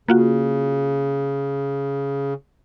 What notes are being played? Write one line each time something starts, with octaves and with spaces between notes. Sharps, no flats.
C#3 A#3 F4 F#4